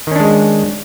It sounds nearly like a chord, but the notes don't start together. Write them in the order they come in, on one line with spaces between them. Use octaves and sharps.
D#3 C#4 D4 G#3